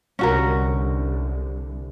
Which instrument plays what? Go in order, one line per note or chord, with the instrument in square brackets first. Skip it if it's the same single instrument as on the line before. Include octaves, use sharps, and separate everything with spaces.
[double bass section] C2 D3 [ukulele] C#4 F#4 A#4